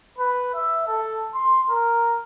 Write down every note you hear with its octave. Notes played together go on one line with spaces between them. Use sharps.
B4
E5
A4
C6
A#4